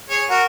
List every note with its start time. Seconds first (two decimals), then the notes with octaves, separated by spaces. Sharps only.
0.09 G#4 C#5
0.29 F#4 A#4